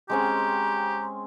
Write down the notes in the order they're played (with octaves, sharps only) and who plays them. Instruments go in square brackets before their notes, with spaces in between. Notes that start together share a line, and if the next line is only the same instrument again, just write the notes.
[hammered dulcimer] G#3 C4 C#4 [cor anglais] G4 [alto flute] A#5